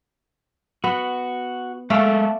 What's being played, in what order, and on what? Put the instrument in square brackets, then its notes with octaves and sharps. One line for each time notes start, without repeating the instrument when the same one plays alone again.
[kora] B3 [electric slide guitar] F#4
[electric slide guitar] G#3 A4 A5 [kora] A3 D5 F5